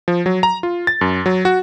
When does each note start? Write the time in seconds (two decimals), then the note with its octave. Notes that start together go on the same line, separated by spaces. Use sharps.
0.08 F3
0.26 F#3
0.43 A#5
0.63 F4
0.87 A6
1.01 F#2
1.26 F#3
1.45 F#4